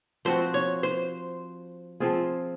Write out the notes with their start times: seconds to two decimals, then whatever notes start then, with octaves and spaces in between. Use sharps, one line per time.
0.25 F3 C4 F#4 C5
0.54 C#5
0.83 C5
2.00 F3 C4 F4 G#4